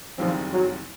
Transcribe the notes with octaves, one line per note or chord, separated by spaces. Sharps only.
F#1 F#2 D#3 F3 G3 C4
F#3